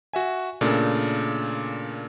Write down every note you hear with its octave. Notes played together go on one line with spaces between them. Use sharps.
F#4 E5 G#5
A#2 C#3 A3 D4